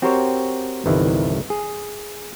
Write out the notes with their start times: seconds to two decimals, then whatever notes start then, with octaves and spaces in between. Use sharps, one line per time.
0.02 C4 F#4 G4 A#4 C5 C#5
0.86 G1 C2 D#3 E3
1.50 G#4